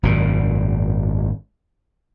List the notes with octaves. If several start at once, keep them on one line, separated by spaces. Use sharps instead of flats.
G#1 F#2 A#2